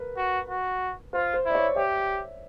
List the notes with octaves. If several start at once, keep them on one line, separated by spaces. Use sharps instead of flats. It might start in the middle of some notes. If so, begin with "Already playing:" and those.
Already playing: A#4 B4
F#4
F#4
F4 C5
C5
E4 D5
C#5
G4 E5